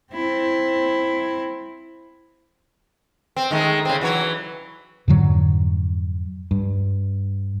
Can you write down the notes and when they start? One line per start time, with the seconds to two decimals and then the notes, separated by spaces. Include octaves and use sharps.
0.13 C4 E4
3.36 C4
3.51 D#3 G#3 A3
3.85 C#3 C4
4.01 E3 F#3 C#5
5.08 F2 G#2 D3 F#3
6.51 G2